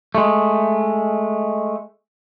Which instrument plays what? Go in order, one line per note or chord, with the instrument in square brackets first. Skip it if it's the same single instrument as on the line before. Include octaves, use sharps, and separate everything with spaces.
[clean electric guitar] G#3 A3